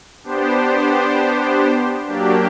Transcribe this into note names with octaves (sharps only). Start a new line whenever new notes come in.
B3 D4 G4 C5
F#3 A#3 D4 G4